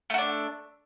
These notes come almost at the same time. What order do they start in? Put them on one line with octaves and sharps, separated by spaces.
A3 F#4 D4